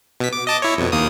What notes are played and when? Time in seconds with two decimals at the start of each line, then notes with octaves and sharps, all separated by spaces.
0.20 B2 B6
0.33 D6
0.47 D#5 A5 D6
0.62 E4 C#5
0.78 F2 B2
0.92 D#2 A#3 D#6